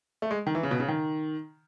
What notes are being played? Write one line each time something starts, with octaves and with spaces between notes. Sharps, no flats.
A3
G#3
D#3
E3
C#3
B2
C#3
D#3